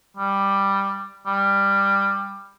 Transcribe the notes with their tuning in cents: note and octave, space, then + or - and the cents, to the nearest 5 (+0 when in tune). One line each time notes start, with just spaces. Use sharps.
G3 +5
G3 +15